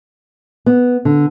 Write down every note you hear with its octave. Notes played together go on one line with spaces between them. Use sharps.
B3
D3